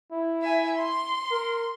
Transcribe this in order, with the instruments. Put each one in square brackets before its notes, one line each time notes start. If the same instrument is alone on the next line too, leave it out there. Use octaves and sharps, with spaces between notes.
[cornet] E4
[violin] E5 G#5
C6
[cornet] A#4